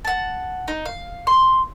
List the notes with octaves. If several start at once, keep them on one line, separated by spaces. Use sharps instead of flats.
F#5 A5
D#4
F5
C6